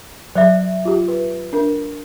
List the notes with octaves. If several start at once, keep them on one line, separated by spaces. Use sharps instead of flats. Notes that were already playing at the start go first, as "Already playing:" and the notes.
F#3 C5 D5 E5
F4 G4
B4
D4 A#4